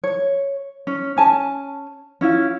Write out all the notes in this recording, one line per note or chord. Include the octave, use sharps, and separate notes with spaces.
C#5
C#4
C#4 G#5 A5
C#4 E4 F4